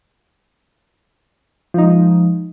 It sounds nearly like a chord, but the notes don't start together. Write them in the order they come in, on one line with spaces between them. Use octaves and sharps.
F3 D#4 G#3